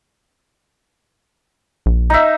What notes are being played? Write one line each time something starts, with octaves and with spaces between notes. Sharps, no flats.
A#1
D#4 E5